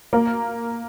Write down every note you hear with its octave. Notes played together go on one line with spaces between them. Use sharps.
A#3